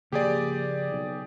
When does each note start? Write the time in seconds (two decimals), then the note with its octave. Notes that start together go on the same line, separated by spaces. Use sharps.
0.12 C#3 F3 A#3 G4 G#4 D5
0.92 B1